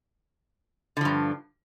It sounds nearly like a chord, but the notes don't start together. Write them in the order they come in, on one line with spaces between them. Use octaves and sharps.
D3 F3 G2